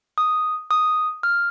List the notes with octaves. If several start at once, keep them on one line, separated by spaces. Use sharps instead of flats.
D#6
D#6
F6